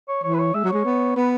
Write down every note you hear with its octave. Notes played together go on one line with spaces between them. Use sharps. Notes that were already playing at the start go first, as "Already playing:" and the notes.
C#5
E3 C#5
B4
C#5
G#3 E5
F#3
G#3 C#5
B3
B3 B4